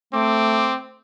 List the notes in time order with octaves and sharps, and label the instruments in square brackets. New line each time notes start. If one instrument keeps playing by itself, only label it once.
[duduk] A3 [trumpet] C4 [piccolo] D6